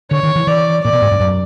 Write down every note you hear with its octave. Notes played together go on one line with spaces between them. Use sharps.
D3 C#5
D#3
E3
E3 D5
A#2 D5
B2
G#2
G2
F#2